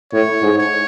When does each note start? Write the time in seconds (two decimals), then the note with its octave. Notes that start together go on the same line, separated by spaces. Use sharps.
0.13 A2 C#5
0.42 G#2
0.58 C#5